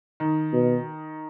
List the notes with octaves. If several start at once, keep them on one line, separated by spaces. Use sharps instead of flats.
D#3
B2